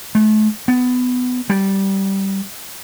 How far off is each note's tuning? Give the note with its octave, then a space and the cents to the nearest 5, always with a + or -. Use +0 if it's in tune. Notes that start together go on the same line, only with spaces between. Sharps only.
A3 -40
B3 +20
G3 -15